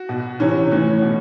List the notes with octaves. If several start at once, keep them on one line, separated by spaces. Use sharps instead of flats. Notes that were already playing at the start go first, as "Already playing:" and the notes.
Already playing: F#4
B2
C3 E3 C#4
A2 E3 C#4
B2